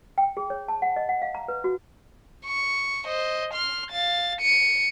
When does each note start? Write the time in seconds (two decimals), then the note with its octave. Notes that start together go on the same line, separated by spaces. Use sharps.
0.18 G5
0.37 G#4
0.50 C#5
0.68 A5
0.82 F#5
0.96 D#5
1.09 F#5
1.22 F5
1.35 A#5
1.48 B4
1.64 F#4
2.45 C#6
3.06 C5 D#5
3.53 C6 F6
3.91 F5 A6
4.41 C#7 D#7